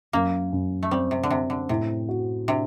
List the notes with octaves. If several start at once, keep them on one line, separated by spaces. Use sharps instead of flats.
F#2 A#3
F#2
A3
G3 C4
C3
D3
C3 C4
D3
A2 C3
F#4
C3 D4